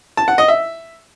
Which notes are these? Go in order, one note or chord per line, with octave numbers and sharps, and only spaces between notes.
A5
F#5
D#5
E5